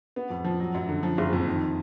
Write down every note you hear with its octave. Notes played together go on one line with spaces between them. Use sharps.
B3
F2
F3
F#3
F#2
D3
F3
F#1
F2
D#3